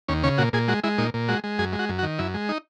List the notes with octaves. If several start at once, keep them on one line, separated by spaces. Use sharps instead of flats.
D#2 C#4
C#3 C#4
A#2 F#4
A#2 G#4
G#3 F#4
G#3 E4
A#2 D#4
A#2
G#3 F#4
G#3
F#2 G#4
G#3
F#4
F#2
F#4
D#3
F#2 E4
G#3
D#4